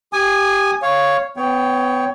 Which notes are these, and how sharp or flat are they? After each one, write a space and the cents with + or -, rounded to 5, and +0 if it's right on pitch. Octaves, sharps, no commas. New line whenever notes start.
G4 +0 G#5 -5 D#6 -30
C#5 +0 F5 +0
B3 +30 C#5 +15 G5 +0